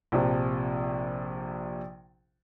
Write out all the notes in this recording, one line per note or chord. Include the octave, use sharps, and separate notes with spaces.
A#1 C3 F3 C5